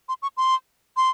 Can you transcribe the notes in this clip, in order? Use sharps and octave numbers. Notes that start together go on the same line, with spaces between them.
C6
C#6
C6
C6